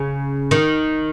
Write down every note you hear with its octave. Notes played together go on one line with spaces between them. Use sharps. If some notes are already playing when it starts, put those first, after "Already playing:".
Already playing: C#3
D#3